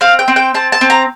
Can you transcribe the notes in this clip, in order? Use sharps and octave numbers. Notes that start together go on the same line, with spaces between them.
C4 F5
G5
C4
G5
C4 A5
A5
C4
A#5